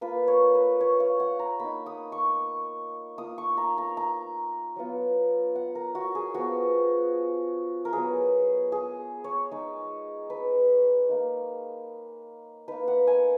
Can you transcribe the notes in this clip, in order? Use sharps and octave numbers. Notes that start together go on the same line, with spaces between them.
A#3 F4 B4
C#5
B4
C#5
F5
F#5
A#5
A#3 D#4 B5
D#6
C#6
A#3 F4 D#6
C#6
A#5
A#5
A#5
F#3 B3 F4
F#5
A#4
F#4
G#4
F3 B3 F4 F#4
A#4
F#3 B3 F4 G#4
G#4
C#5
G#3 D#4
B4
A#3 D#4
A#3 D#4 B4
F#5
G#5